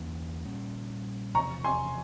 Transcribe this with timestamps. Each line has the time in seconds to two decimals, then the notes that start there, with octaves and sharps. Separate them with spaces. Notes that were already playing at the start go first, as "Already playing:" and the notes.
Already playing: E2 E3 A#3 C#4
0.45 A#1 A#2 G3 C#4
1.35 E1 E2 C3 F3 A#5 C#6
1.64 G#5 C6